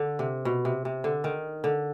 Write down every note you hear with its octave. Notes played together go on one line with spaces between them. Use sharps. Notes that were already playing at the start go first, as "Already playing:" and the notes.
Already playing: D3
C3
B2
C3
C3
D3
D#3
D3